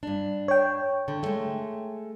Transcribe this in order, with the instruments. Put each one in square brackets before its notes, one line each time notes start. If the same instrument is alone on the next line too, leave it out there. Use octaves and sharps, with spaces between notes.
[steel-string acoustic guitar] G2 D4
[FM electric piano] C#5 G5
[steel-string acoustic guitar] D3
G#3 A3